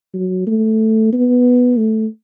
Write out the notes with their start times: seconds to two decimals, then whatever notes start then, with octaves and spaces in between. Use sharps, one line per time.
0.14 F#3
0.47 A3
1.13 B3
1.77 A3